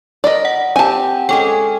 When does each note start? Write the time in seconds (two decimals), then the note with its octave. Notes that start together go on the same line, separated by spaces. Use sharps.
0.24 A#4 D5 D#5 B5
0.45 F#5
0.76 C4 G4 G#5 A5
1.29 G#3 C#4 A4 G5